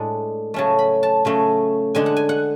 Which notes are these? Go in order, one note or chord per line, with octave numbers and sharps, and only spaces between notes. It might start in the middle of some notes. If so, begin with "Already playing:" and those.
Already playing: A2 G#3 D4
C#3 F#3 A3 C#4 A5
B5
A5
C#3 F#3 A3 C#4
D3 G#3 D4 G#5
F#5
G#5
F#5